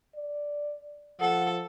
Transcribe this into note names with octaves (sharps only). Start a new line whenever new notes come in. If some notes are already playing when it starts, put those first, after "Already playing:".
D5
F3 A4 F#5